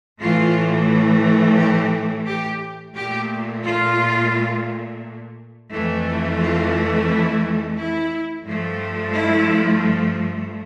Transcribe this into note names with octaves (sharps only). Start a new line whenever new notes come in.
A2 E3 A3 F4
G4
G4
A#2 A3 G4
F4
F2 E3 A3
F4
E4
E4
G2 F3 A3
E4